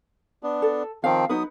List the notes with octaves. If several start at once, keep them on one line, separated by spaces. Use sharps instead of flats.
B3 D4
A4
D#3 F3 C4 F5
F#3 B3 D#4 B4 D#6